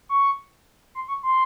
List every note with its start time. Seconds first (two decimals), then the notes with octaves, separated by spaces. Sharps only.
0.09 C#6
0.95 C6
1.08 C#6
1.23 C6